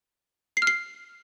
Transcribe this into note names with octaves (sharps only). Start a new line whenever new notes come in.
C7
F6
C7